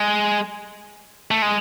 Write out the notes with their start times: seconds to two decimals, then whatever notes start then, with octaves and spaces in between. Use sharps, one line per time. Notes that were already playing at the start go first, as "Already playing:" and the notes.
Already playing: G#3
1.31 A3
1.42 G#3